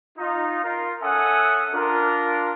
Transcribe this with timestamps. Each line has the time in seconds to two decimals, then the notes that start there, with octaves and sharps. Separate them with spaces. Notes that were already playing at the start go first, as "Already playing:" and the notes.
0.18 D#4 F4
0.64 F4 A#4
1.02 C#4 A4 E5 F#5 G#5 D#6
1.74 D4 F4 A#4